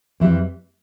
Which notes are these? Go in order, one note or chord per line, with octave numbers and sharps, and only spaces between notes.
F2 E3 G3 E4